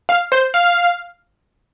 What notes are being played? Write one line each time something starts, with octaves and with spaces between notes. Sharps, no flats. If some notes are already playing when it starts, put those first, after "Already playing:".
F5
C5
F5